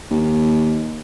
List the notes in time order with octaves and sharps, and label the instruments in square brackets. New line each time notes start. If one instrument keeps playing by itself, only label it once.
[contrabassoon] D#2